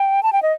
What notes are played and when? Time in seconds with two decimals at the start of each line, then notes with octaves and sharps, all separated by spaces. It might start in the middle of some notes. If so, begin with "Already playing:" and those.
Already playing: G5
0.23 A5
0.33 G5
0.42 D#5